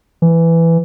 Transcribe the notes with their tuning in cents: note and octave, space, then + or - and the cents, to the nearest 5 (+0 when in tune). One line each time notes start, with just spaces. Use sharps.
E3 +10